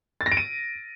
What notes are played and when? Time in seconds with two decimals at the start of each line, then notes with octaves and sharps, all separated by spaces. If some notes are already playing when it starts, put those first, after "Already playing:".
0.21 A6
0.26 A#6
0.32 D7
0.37 D#7